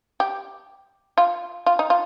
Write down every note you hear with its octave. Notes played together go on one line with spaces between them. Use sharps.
G4
F4
F4
D#4
F4